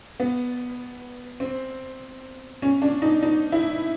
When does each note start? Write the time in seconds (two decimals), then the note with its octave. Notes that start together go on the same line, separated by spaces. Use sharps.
0.20 B3
1.40 C4
2.62 C#4
2.82 D4
3.02 D#4
3.23 D#4
3.52 E4